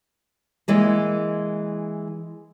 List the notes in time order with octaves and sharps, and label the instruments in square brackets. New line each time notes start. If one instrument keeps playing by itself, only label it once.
[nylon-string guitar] E3 G#3 A#3